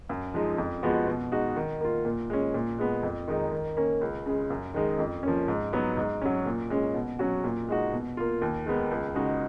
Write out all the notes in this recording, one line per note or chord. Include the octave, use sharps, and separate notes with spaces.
F#2
F3 G#3 D#4
F2
F3 G#3 B3 F#4
B2
G#3 D#4 F#4
D#3
A#3 F4
A#2
G#3 C#4
A#2
G#3 B3
F2
D#3 G#3 D#4
D#3
A#3 C#4
C#2
C#3 G#3
F#2
D#3 G#3 D#4
F2
F3 A#3 C#4
G#2
F#3 B3 D#4
G#2
F#3 C#4
A#2
G#3 C#4
B2
F#3 C#4 F#4
A#2
G#3 D#4 F#4
B2
A#3 F4
D#2
D#3 G#3 B3
C#2
C#3 G#3 D#4 F#4